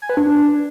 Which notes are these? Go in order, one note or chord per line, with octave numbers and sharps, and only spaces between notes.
G#5
B4
D4